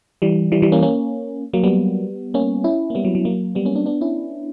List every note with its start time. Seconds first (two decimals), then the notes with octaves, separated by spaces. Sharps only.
0.22 E3 G3
0.52 E3 G3
0.62 E3 G3
0.72 A#3 C#4
0.82 A#3 C#4
1.53 F#3 A#3
1.64 G3 B3
2.34 A#3 C#4
2.64 C#4 E4
2.90 A#3
2.95 G3 B3
3.05 F#3
3.15 F#3
3.25 F#3 A#3
3.55 G3 B3
3.65 A#3 C#4
3.76 B3 D4
3.86 B3 D4
4.01 C#4 E4